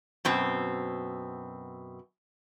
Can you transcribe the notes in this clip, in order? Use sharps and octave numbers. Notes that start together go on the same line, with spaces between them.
F#2 B2 C4